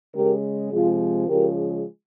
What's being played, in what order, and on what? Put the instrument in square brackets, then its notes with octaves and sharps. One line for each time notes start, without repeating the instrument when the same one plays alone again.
[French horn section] C#3 G#3 G4 A#4
C3 F3 G#3 F4 G#4
C#3 F3 G#3 G4 A#4